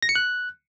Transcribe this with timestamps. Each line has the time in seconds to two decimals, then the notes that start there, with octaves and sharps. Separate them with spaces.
0.03 A#6
0.09 C#7
0.15 F#6